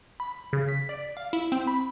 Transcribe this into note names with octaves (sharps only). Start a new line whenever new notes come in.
B5
C#3
B6
D5
F5
E4
C4
B5